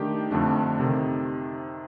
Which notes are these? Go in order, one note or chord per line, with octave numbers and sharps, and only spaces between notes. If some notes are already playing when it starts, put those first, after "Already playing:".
Already playing: D#3 A3 D4 G4
F2 D3 A3 D4
C3 D#3